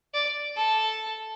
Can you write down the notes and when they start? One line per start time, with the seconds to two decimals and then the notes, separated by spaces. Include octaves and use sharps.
0.14 D5
0.56 A4